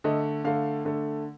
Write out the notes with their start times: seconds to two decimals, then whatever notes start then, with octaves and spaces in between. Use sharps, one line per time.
0.04 D3 A3 D#5
0.44 D3 A3 F5
0.85 D3 A3